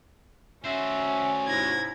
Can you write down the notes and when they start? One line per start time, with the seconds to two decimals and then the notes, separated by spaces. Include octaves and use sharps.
0.65 C#4 F#4 C5 E5
1.48 G#2 C3 E4 G#6 A#6